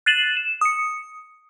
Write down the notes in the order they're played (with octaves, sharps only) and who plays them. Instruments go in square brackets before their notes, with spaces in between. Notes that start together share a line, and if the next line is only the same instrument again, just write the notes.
[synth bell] F#6 A6 C7 D#7 E7 F#7
E7
D#6 C#7